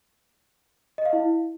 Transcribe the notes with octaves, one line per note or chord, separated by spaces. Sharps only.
D#5
F5
E4